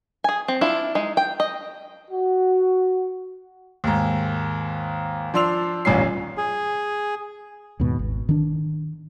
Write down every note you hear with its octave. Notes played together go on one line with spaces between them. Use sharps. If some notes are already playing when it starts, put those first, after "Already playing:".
G#4 G#5
C4
D4 E4 F4
G#3 D#4
G5
D#5
F#4
D#2 G#2
F3 D4 C6 E6 F7
D#1 A1 G2 A#2 C#4 C7
G#4
D#2 G#2 B2
G#1
D#3 D4